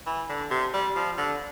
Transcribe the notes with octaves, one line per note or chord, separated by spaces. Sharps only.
E3
D3
C3
G3
F3
D3